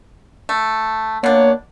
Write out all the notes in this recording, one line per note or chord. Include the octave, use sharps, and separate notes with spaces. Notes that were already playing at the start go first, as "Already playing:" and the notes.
A3
B2 A#3 D4 C#5